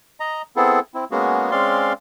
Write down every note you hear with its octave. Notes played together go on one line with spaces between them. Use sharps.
D#5 A#5
B3 C4 E4 G#4 A4
C4 E4
G#3 A#3 B3 C#4 F#4 G#4
G#3 C4 C#4 D5 F5 C6